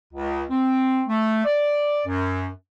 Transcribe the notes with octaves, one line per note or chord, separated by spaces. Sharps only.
C#2
C4
A3
D5
F#2